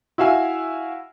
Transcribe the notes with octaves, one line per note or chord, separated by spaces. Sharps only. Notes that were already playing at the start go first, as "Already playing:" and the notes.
E4 F#4 E5 F5 G#5 E6